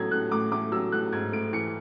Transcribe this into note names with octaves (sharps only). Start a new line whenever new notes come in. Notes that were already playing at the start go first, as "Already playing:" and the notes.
Already playing: A2 F#3 A3 G#6
A2 F#6
A2 D6
A3 D6
F#3 E6
A2 F#6
G#2 G#6
A3 D7
E3 C#7